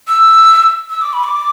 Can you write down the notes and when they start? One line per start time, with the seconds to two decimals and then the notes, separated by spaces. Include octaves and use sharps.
0.08 E6
0.90 E6
1.01 D6
1.13 B5
1.25 D6